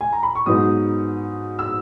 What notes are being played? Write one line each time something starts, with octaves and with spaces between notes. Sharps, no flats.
G#5
A#5
B5
C#6
G#2 F#3 B3 D#4 D#6
E6